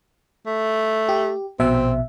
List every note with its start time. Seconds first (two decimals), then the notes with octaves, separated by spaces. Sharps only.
0.46 A3
1.09 G4
1.60 A#1 B2 C4 E5